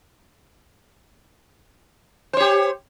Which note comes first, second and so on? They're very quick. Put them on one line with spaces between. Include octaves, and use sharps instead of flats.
C5 C#5 G4